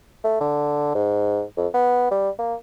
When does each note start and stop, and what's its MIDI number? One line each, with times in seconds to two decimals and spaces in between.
0.24 0.36 57
0.40 0.91 50
0.95 1.42 44
1.57 1.68 41
1.74 2.07 59
2.11 2.30 55
2.39 2.55 58